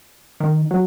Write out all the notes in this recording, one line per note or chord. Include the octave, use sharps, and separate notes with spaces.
D#3
F#3